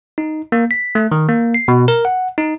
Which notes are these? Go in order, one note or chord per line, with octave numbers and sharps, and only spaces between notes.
D#4
A#3
B6
A3
D#3
A#3
C7
B2
A#4
F#5
D#4